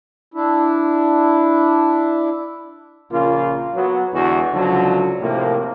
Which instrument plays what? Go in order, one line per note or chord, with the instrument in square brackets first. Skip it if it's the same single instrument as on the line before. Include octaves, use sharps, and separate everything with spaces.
[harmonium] D4 E4
[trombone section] A#1 C#3 A#3 F4
F#3 B3
E2 D3 E3 G#3 F#4
C#2 D3 F3 F#3
A2 C3 F3 A#3